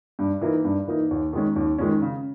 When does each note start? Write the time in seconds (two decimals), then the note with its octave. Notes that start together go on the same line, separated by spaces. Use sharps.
0.19 G2
0.41 E3 A#3 D#4
0.64 G2
0.87 E3 A#3 D#4
1.11 D#2
1.33 D#3 G#3 C#4
1.56 D#2
1.78 D#3 G#3 C#4
2.02 C#3